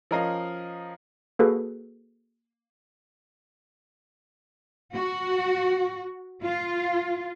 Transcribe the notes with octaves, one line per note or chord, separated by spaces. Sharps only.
F3 C#4 A#4 D#5 F5
A#3 F#4 G#4 A4 B4
F#4
F4